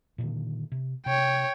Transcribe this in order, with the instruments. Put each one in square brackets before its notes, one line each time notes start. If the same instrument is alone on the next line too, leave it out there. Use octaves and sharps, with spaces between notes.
[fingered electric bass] A#2 D3 D#3
C3
[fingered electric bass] C3 [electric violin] C#5 G5